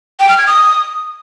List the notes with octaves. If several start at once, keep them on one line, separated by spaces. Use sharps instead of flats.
G5
F6
G#6
D#6